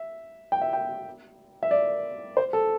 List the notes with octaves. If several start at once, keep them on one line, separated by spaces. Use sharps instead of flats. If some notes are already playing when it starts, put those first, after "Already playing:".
Already playing: E5
G5
E5
G5
E5
D5
C5
A4